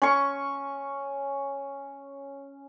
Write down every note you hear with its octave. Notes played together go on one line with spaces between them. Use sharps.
C#4 C#6